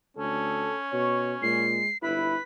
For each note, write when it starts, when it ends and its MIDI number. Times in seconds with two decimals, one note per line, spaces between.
0.17 0.71 38
0.17 1.78 61
0.17 0.78 69
0.93 1.35 47
0.93 1.34 73
1.42 1.81 46
1.42 1.90 56
1.42 1.97 96
2.03 2.35 31
2.03 2.37 64
2.03 2.41 71
2.03 2.43 95